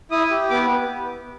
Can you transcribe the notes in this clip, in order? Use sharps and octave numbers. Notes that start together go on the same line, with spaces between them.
E4 D#6
G4
B3 D6